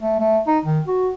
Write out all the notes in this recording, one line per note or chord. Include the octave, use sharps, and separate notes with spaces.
A3
A3
D#4
D#3
F#4